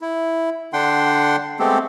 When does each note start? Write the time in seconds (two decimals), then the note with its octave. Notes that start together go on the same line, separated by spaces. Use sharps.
0.01 E4
0.73 D3 D4 F#5 G5 C6
1.59 G#3 A3 B3 C4 G4 A4